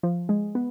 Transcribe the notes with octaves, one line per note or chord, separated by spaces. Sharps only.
F3
G#3
B3